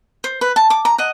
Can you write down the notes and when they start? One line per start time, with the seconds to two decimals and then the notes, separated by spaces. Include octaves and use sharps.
0.24 C5
0.41 B4
0.56 A5
0.70 D6
0.85 A#5
0.98 D#5 F#5